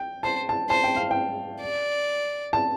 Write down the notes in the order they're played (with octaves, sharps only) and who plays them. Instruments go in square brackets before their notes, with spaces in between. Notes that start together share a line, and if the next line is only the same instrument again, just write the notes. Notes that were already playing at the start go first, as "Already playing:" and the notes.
Already playing: [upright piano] G5
[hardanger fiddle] C5 [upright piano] A5
[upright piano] A5
[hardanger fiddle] C5 [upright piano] A5
[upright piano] G5
F5
G5
[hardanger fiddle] D5
[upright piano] A5